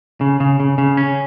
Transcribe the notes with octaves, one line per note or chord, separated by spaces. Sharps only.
C#3
C#3
C#3
C#3
C#4